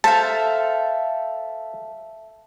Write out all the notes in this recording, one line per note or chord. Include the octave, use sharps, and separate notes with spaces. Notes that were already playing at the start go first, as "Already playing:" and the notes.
A4 C5 E5 F5 A5